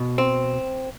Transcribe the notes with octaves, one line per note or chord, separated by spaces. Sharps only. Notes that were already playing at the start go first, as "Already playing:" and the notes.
Already playing: B2
C4